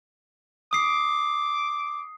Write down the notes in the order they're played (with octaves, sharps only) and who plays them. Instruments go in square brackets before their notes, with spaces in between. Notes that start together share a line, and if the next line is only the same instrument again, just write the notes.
[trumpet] D6 [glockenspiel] D#6 C7